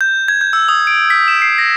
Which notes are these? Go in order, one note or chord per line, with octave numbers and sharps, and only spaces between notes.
G6
G#6
G6
E6
D#6
D7
B6
E7
C7
A#6